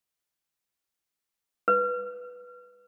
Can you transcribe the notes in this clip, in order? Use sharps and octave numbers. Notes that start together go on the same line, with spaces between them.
B4